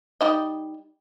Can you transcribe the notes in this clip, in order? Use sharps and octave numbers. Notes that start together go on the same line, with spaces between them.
G3 D#4 D#5